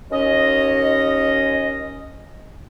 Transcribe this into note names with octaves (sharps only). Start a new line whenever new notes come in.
D#2 C#4 D#5